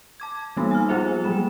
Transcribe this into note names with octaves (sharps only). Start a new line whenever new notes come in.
A5 D6 G#6
E3 G3 A#3 B3 D#4
G#5 F6
F3 F4 G#4 C5 E5
F#3 G3 A#3 E7